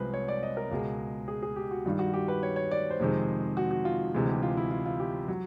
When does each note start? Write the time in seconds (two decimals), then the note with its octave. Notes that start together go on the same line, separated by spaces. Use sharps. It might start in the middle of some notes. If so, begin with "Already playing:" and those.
Already playing: C2 C3 F3 G#3 B4 C5
0.14 C#5
0.28 D5
0.43 D#5
0.57 A#4
0.71 C#2 B2 G#3
1.28 G#4
1.42 G#4
1.56 G4
1.71 F#4
1.85 G2 D#3 G3 F4
1.99 F#4
2.13 G4
2.28 B4
2.43 C#5
2.56 C#5
2.71 D5
2.91 C5
2.99 F2 C3 D#3 G#3
3.57 F#4
3.71 F#4
3.85 F4
4.14 D2 C3 E3 G#3
4.28 G4
4.43 F4
4.57 E4
4.71 F4
4.86 F4
5.00 G4
5.28 F#3